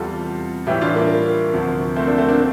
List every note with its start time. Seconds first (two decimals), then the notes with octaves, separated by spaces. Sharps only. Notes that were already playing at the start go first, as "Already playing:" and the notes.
Already playing: E2 C3 G3 F4 A4
0.67 A2 E3 G3 E4 G4
0.82 D4 F4
0.96 A#3
1.53 D2 C3 F3
1.96 A3 C4
2.07 A#3 D4
2.18 A3 C4
2.29 A#3 D4